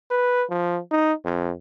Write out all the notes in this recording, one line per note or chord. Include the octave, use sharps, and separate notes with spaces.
B4
F3
D#4
F2